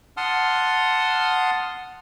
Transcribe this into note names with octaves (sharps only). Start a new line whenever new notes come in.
F#5 A5 C6 D#6 F6